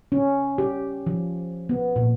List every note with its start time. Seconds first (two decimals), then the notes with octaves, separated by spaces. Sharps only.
0.12 C#4
0.58 G4
1.07 F3
1.69 B3
1.96 A#2